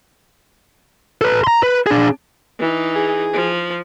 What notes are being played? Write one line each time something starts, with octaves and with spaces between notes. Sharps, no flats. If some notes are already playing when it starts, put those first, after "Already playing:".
A4 B4
A#5 C6
B4
D4 G#4
E3 D#4
G#4
F3